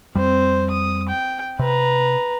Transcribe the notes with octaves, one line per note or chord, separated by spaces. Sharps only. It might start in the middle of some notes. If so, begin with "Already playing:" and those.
F2 G3 C4 C5
D#6
G5
C3 B4 A#5